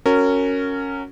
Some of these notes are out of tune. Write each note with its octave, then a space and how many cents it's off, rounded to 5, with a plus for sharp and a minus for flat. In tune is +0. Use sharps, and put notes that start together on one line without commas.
C#4 +0 F#4 +0 A#4 -20